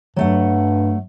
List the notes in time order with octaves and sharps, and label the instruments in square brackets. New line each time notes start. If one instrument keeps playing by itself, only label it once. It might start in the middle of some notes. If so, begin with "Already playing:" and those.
[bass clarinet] G2 [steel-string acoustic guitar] F#3 A3 F#5